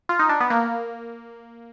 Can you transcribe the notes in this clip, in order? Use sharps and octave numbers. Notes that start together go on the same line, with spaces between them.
F4
D#4
D4
B3
A#3